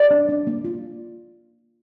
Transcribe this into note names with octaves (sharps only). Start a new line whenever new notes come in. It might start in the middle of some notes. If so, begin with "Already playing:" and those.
Already playing: D5
D4
D4
A#3
F4